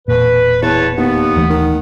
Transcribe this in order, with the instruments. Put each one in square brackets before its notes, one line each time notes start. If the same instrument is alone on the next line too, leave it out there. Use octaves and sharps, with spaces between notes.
[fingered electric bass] E1 A#2 [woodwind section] B4
[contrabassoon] E2 [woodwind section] B4 C#5 A5
[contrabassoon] D#2 [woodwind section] B3
[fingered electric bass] D#1 E3 A3
[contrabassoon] D#3